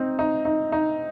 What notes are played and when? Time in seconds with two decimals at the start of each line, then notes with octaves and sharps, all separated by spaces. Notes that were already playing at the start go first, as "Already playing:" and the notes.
Already playing: C4 D#4
0.19 D#4
0.45 D#4
0.72 D#4